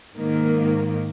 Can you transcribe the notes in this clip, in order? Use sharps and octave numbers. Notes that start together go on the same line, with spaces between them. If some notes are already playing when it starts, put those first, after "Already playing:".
G#2 D#3 A#3